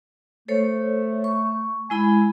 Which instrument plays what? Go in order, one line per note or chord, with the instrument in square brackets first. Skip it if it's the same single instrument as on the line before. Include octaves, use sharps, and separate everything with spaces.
[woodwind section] A3 [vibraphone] A4 C5 C#5
[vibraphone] C#6
[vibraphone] G#3 E4 B5 [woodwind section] G#5